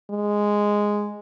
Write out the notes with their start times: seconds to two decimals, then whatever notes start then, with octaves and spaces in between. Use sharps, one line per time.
0.11 G#3